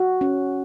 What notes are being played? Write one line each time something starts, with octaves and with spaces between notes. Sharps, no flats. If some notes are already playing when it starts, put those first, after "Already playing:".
Already playing: F#4
C#4